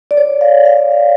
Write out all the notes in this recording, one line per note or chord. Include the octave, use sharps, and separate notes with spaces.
D5
C#5
F5
F5